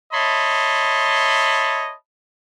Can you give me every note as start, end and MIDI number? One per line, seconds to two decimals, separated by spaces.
0.12 1.94 73
0.12 1.94 75
0.12 1.94 76
0.12 1.94 81
0.12 1.94 83
0.12 1.94 84